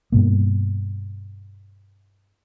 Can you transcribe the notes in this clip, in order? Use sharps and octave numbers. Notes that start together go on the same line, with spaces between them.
G2 B2 A#3